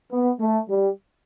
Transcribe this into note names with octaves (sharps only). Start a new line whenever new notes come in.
B3
A3
G3